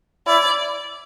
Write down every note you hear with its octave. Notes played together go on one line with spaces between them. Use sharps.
E4 D5